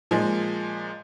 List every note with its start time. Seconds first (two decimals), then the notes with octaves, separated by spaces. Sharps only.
0.11 A#2 F3 G#3